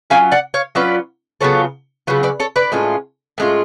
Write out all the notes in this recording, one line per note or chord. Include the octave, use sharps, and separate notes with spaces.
F#3 C#4 F4 F5 G#5
D5 F#5
C#5 F5
F#3 C#4 F4 B4 D5
C#3 F#3 B3 F4 A4 C#5
C#3 F#3 B3 F4
B4 D5
A4 C#5
B4 D5
A2 G#3 C#4 F4
A2 G#3 C#4 F4